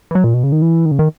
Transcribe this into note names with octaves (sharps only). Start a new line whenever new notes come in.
E3
F#3
A#2
B2
C#3
D#3
E3
D#3
C#3
D#3